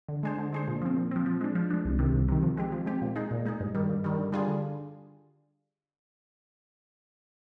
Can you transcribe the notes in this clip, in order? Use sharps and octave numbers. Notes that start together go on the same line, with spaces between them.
D3
G#3 D4 G#4 C5
D3
G#3 D4 G#4 C5
A#2
F3 C4
A#2
F3 C4
F3
G#3 D4
F3
G#3 D4
C2
C3 D#3
C2
C3 D#3
F3
G#3 C4 G4
F3
G#3 C4 G4
A#2
G#3 D#4 G#4
A#2
G#3 D#4 G#4
G2
D#3 G3
G2
D#3 G3
D3
G3 D4 F4 G#4
D3